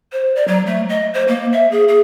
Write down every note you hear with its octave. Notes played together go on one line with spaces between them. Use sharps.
C5
D5
F#3
A3
D#5
C5
A#3
E5
G#4
G#4